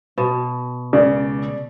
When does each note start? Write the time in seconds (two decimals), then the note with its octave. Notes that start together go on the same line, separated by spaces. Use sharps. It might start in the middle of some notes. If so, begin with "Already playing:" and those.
0.18 B2
0.93 C#2 C#3 D5